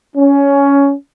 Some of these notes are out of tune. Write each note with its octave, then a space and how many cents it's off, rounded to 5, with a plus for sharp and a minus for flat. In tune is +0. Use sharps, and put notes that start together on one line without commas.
C#4 +15